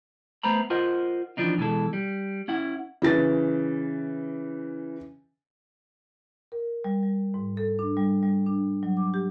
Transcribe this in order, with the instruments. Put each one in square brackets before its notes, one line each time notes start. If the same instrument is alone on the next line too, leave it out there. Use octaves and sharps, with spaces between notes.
[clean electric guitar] A3 B3 C5 A#5 B5
F4 A#4 C5 D#5 F#5
E3 F3 D4 D#4
B2 E3 G#3 A4
G3
C#4 E4 F#5
[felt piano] C#3 E3 A6
[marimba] A#4
G3
G3
G#2
A4
D4
G3
G3
D4
F#3
D6
G4